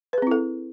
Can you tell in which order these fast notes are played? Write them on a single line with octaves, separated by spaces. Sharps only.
B4 G#4 C4 E4 A4